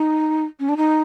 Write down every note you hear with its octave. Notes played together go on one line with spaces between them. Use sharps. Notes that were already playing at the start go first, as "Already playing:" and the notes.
Already playing: D#4
C#4
D4
D#4